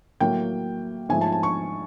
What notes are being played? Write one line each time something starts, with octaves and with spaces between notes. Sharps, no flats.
A2 F#3 A#3 G5
G#2 F3 A3 G#5
A5
A5
C#6